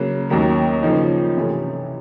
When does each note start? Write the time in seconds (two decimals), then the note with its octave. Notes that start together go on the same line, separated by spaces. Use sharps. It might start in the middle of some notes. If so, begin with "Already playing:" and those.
Already playing: C#3 F#3 A#3
0.30 D#2 D#3 F#3 A#3 C#4
0.83 C#3 F3 A#3 D#4
1.37 C3 E3 A3 C#4